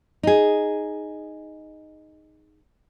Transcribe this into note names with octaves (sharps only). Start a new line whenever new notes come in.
D#4 G#4